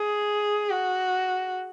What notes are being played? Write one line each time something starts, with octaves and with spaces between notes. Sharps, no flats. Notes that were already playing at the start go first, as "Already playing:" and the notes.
Already playing: G#4
F#4